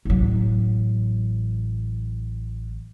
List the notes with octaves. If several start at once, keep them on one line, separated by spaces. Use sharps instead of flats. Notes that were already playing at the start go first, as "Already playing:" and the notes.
A1 F#3